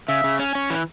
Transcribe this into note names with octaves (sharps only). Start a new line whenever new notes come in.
C#3 E5
C#3
C#4
C#4
E3